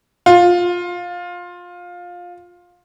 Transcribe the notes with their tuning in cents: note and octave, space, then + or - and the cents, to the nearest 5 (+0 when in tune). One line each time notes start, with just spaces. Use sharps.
F4 +15